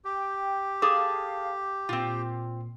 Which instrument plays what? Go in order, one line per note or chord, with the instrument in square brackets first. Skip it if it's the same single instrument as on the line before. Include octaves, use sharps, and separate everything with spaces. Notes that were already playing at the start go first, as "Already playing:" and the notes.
[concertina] G4 [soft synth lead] G5
[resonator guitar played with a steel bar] G#4 A4 [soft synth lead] F5 [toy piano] D6
[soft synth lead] A#2 [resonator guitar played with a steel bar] C4 F4